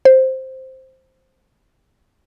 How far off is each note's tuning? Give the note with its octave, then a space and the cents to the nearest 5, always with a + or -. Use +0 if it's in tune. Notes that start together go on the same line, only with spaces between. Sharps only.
C5 +5